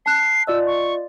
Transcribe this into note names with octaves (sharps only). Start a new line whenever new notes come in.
A5 F#6 C7
F4 D5 D#5 E6
C#6